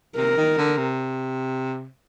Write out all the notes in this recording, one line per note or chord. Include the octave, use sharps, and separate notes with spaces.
C3 A#4
D#3
D3
C3